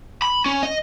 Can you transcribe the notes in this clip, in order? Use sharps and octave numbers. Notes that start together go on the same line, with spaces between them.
B5
C#4
D#5